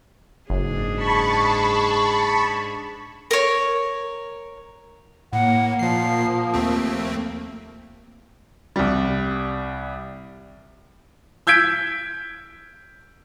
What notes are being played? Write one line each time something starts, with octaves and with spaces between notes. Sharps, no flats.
F#1 G#2 D4 G#4
A5 B5 C#6
A#4 C#5
A2 A#3 F#5
A#2 F3 C7
D#2 A3 C4
C2 G3
E6 G6 G#6 B6 D7